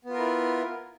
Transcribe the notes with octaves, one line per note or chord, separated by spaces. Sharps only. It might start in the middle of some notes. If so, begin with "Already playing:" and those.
B3 E4 F4 A#4